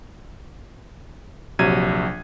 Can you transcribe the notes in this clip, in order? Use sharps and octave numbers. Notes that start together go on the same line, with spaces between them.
A#1 C3 F#3 G#6 D#7